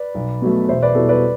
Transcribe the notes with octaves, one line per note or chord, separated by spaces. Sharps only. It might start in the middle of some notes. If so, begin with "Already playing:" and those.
Already playing: B4 D5
B1
B2 F#3 A3
E1 C5 E5
B4 D5
E2 B2 G3 F#4 A4
B4 D5